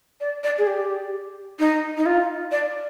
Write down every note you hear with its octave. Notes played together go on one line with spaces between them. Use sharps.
D5
D5
G#4
G4
D#4
D#4
F4
D5